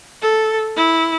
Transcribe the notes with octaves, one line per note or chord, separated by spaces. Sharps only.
A4
E4